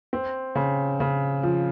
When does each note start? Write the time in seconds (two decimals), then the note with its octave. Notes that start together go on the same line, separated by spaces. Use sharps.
0.13 C4
0.56 C#3
1.00 C#3
1.43 F3